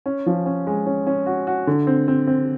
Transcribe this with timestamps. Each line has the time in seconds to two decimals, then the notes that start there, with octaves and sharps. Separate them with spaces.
0.06 C#4
0.26 F3
0.46 C#4
0.67 G#3
0.86 C#4
1.07 C#4
1.26 F#4
1.47 F#4
1.67 D3
1.87 C4
2.08 C4
2.27 C4